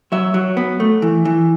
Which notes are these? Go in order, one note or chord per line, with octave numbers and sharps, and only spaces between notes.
F#3 E5
F#3
B3
A3
E3
E3